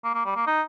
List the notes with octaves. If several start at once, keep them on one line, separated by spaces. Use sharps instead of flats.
A#3
A#3
G3
A#3
D#4